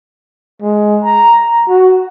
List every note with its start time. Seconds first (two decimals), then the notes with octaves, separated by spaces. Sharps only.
0.62 G#3
1.04 A#5
1.69 F#4